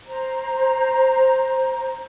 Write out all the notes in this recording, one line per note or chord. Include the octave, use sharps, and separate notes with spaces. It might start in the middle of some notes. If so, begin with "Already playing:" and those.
C5 A#5